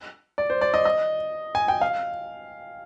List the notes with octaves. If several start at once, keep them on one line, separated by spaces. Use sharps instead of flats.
D5
C5
D5
D#5
D#5
G#5
G5
F5